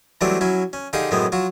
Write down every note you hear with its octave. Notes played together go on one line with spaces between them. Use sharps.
E3 F#3 G3 A3 C4 D4
F#3 C#4 E4
C#4
D3 D#4 G4 G#4 F5
F#2 A2 G#3 B3 C4
F#3 F4 F#4